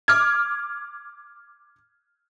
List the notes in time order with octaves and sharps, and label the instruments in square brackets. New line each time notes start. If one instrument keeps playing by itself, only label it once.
[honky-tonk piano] D6 F6 G#6